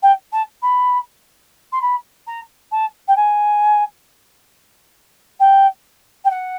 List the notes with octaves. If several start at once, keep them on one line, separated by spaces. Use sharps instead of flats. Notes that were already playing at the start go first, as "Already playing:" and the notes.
G5
A5
B5
C6
B5
A#5
A5
G5
G#5
G5
G5
F#5